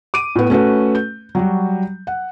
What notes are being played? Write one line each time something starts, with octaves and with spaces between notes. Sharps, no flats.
D6 D7 D#7
A2 B3
A3 C#4 F#4 B4
G6
F#3 G3 F#4
F#5